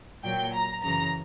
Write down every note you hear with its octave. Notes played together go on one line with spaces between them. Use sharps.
A#2 F#3 G5
A#5
F#2 C#3 E3 A#5